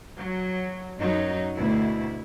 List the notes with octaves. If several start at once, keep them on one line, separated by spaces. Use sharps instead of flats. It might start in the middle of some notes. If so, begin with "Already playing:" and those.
F#3
F#2 F#3 D#4
D2 B2 E4